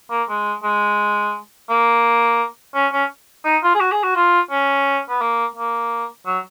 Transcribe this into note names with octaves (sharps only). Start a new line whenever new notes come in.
A#3
G#3
G#3
A#3
C#4
C#4
D#4
F4
G#4
F#4
G#4
F#4
F4
C#4
B3
A#3
A#3
F#3